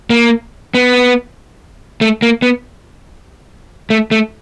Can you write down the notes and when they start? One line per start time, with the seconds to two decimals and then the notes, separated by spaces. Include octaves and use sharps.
0.10 A#3
0.75 B3
2.01 A3
2.22 A#3
2.42 B3
3.90 A3
4.11 A3